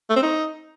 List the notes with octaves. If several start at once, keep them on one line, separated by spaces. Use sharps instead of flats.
A3
C4
D#4